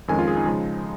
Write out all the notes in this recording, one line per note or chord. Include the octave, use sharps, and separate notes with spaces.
F2 D#3 G#3 C#4 G#5
F4
G#4
D#4
C#3 F3 G#3